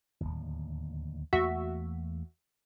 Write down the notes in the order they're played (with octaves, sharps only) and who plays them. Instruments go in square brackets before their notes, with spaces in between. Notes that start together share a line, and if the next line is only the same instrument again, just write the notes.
[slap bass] D1 G#1 D#2
[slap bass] E2 A3 A#3 [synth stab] F#4 E5